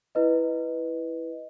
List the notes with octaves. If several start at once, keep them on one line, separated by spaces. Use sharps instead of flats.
E4 B4 D#5